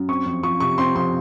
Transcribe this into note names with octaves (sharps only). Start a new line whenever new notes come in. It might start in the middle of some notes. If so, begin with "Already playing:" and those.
Already playing: F#2
C4 C#6
F2
F3 C#6
C3 C#6
C4 C6
F2 C6